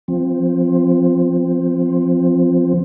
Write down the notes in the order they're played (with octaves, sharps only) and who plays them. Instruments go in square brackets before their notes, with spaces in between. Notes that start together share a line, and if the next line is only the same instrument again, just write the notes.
[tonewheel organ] F3 C4